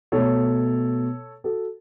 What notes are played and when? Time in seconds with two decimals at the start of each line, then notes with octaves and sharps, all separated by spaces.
0.12 B2 A3 A4 C#5
1.44 F#4 A4